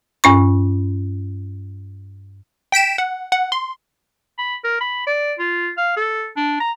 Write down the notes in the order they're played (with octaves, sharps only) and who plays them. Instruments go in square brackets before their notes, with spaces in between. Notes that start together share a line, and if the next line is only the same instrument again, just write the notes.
[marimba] G2 C#4 C#6
[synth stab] G5 B6 D7 E7
F#5
F#5
C6
[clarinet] B5
A#4
B5
D5
F4
F5
A4
D4
A#5